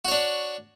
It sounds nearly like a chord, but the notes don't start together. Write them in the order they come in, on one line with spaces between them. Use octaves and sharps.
F#4 C#5 D4